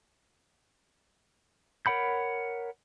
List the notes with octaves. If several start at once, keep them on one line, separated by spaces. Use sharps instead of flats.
A#4 C#5 F#5 B5 G6